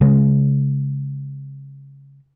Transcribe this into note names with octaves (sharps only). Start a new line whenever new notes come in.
C#3 G#3